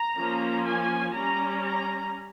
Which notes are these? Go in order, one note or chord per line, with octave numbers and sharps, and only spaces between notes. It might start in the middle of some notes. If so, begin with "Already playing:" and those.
Already playing: A#5
F3 A#3 C#4
G#5
G3 C#4 A#5
A#5